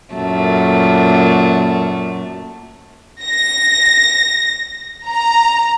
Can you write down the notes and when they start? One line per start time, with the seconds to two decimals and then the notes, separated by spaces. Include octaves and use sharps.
0.13 F#2 A#2 A3
3.24 A#6
5.09 A#5